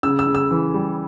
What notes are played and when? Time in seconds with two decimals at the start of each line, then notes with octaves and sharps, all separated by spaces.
0.03 C#3 E6
0.19 E6
0.27 C#3
0.35 E6
0.51 E3
0.74 G3